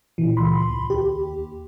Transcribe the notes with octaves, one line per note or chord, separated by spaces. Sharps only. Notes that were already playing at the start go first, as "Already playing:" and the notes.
A#2 E3
C#2 B5 C6
D#2
G4